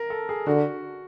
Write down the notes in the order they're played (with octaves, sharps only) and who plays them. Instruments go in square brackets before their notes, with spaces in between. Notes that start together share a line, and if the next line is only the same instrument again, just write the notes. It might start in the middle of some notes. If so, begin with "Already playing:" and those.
Already playing: [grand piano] A#4
A4
G#4
[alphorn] D3 [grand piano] F#4